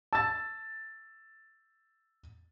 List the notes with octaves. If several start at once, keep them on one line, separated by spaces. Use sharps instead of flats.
A5 E6 A6